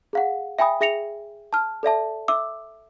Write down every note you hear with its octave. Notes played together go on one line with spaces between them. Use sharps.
G#4 F5 F#5
E5 G5 G#5 B5 D#6
G#4 E5 A#6 C#7 F7
A5 F6
A4 D5 E5 A5
E5 D6 E6